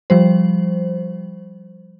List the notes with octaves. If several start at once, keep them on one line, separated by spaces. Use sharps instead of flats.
F3 G3 C5